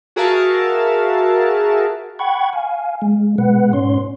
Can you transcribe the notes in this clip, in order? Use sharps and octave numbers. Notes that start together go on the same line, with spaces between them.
F#4 G#4 A#4 E5 F5 A5
F#5 G5 B5 C#6 G#6
F5 G#5
G#3
B2 G#3 B4 F#5
G#2 C#4 C#5 C6